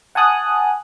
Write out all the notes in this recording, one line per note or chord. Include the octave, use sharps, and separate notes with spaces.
F#5 G#5 A5 D#6 F#6